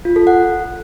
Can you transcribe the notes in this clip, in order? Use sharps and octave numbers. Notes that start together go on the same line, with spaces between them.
F4
A4
F#5